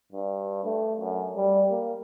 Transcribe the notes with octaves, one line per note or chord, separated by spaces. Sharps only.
G2
A3
F#2
G3
A#3